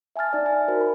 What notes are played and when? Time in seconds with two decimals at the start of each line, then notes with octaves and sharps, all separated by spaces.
0.16 E5 G#5 A5 F6 A6
0.33 D#4 D5
0.46 G#5
0.68 F#4 A#4 C5
0.81 B5